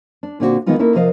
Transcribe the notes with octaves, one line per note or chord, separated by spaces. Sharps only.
D4
A#2 D3 C4 D4 E4 F#4
D#3 E3 G#3 B3 D#4 F4
A#3 C#4 D#4 E4 A4 A#4
C3 F3 A#4 D#5 F5